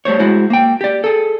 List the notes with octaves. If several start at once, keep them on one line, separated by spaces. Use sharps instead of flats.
G3 A3 C5 C#5
G#3 E4 F#4 C5
A#3 G5
G4 D5
G#4 A4